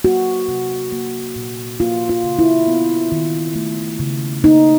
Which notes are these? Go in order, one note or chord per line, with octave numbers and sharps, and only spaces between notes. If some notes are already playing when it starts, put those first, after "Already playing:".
A#3 F#4
C3
A#3
A#2
A#3 F4
F4
C#3
E4
B3
D#3
A3
C#3
A#3 D#4